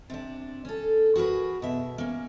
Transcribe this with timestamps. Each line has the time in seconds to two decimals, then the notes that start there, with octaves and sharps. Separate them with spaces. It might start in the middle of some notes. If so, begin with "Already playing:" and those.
0.10 C3 D4
0.65 C#4 A4
1.16 F#4 G#4 A#4 B4
1.62 B2 E5
1.98 A#3 C#4